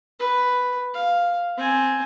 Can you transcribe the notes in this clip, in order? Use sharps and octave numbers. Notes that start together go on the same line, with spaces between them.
B4
F5
C4 G#5